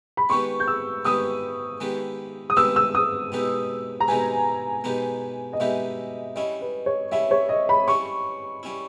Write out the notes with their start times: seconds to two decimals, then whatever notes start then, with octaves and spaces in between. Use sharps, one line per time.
0.17 B5
0.29 D#3 G#3 B3 G4 B4 C#6
0.60 G6
0.68 E6
1.05 D#3 G#3 B3 G4 B4 D#6
1.80 D#3 G#3 B3 G4 B4
2.50 D#6
2.56 D#3 G#3 B3 G4 B4 E6
2.76 E6
2.95 D#6
3.32 B2 G#3 D#4 G4 B4
4.00 A#5
4.08 B2 G#3 D#4 G4 B4 G#5
4.84 B2 G#3 D#4 G4 B4
5.53 D#5
5.60 B2 G#3 D#4 G4 B4 E5
6.36 G3 C#4 E4 D#5
6.61 B4
6.86 C#5
7.12 G3 C#4 E4 E5
7.31 C#5
7.49 D#5
7.69 B5
7.88 G3 C#4 E4 C#6
8.63 G3 C#4 E4